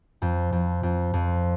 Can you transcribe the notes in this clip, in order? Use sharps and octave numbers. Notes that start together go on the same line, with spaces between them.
F2
F2
F2
F2